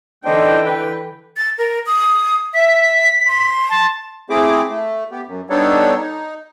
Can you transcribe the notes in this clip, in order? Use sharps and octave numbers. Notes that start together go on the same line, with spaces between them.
D3 E3 D4 D#4 C5 G5
B4
A6
A#4
D#6
E5 B6
C6
A5
A3 C4 E4 G#4 D6
A3
B3 G4
F#2
G3 B3 D4 D#4 A4 C#5
D#4